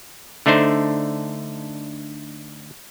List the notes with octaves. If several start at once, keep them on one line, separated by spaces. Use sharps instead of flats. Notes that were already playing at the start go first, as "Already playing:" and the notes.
D3 A3 D4 D#4 C5